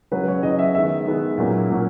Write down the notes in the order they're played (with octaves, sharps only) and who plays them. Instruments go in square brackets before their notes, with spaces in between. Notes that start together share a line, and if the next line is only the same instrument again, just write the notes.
[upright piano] C#3 F#3 C#4 B4
C#5
C#3 F#3 C#4 D#5
E5
D#3 G#3 B3 E5
D#3 G#3 B3
A#2 F#3 A#3 C#4
A#2 F#3 A#3 C#4